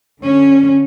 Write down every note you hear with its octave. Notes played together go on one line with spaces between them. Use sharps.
D3 C#4